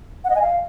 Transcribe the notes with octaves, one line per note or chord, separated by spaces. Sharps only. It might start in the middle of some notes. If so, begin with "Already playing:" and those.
F#5
D#5
G#5
F5